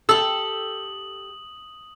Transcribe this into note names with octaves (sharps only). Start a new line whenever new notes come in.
G4 A4 D#6 E6 F#7